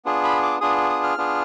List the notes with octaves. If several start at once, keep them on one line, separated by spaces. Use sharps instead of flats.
B3 D4 F4 G#4
B5
D6
B3 D4 F4 G#4 D#6
D#6
F6
B3 D4 F4 G#4